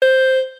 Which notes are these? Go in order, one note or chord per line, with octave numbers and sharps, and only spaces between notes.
C5